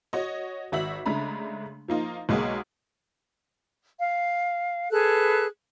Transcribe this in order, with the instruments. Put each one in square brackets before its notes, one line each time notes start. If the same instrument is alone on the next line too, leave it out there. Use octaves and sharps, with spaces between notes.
[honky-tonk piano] F#4 C#5 D#5
G#1 F#4 E5 B6 F#7
C#3 G#3 A3 D4 A#5 B5
F3 A#3 D#4 F4
B1 G#3 A#3 G#4 F#5 D#6
[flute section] F5
G#4 A4 B4 F#6